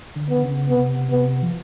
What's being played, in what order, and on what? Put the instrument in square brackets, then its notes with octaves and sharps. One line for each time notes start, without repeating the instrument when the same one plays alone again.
[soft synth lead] D3
[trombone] B3
[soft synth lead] D3
C#3
[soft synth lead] C3 [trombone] B3
[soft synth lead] C3 [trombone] B3
[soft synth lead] F3